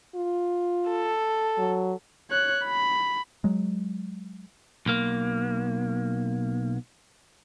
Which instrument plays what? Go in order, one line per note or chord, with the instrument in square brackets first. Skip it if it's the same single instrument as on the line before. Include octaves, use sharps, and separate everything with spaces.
[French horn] F4
[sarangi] A4
[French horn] F#3
[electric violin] C#5 F#6
B5
[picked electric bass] F#3 G#3
[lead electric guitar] B1 A#3